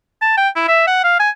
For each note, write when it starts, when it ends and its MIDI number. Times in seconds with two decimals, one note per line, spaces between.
0.22 0.34 81
0.37 0.49 79
0.56 0.66 64
0.68 0.86 76
0.87 1.01 78
1.04 1.19 77
1.20 1.30 80